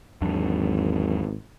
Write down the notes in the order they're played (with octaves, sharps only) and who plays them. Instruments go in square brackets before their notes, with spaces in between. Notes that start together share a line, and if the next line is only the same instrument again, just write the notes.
[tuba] G#1 [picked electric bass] E2 F#3 D4